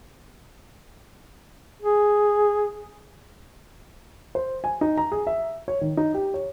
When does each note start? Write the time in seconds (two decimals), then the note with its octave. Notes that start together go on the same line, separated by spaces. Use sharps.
1.82 G#4
4.35 C5
4.64 G#5
4.81 D#4
4.97 A#5
5.12 G#4
5.27 E5
5.68 C#5
5.81 D#3
5.97 D#4
6.14 G4
6.34 C#5